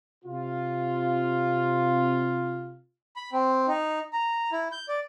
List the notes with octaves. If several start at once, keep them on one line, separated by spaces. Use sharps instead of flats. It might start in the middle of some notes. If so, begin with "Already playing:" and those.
C3 F4
B5
C4
D#4
A#5
E4
G6
D5